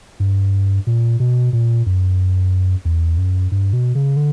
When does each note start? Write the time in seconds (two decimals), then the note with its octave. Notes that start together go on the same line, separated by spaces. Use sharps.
0.20 G2
0.87 A#2
1.20 B2
1.53 A#2
1.86 F#2
2.85 E2
3.18 F#2
3.52 G2
3.73 B2
3.95 C#3
4.17 D3